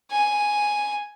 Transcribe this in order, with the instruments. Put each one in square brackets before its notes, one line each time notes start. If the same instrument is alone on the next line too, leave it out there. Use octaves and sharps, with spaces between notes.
[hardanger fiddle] G#5